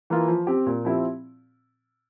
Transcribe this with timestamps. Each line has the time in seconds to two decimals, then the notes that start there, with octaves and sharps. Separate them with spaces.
0.10 E3 A#3 F4
0.28 F3
0.47 C4 G4
0.66 A#2
0.85 F3 C4 E4 G4